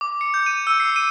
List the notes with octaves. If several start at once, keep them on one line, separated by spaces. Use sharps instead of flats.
D6
C#7
G6
D#7
E6
C7
D#7